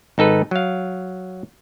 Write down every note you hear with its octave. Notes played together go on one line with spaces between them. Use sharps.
G#1 D#4 A4 B4
F#3 F5